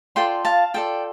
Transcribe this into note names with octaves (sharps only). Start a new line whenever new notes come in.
F4 A4 D5 G5 C6
F5 A5
F4 A4 D5 G5